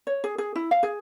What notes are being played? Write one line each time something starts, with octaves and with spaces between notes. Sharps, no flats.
C#5
G#4
G#4
E4
F5
G#4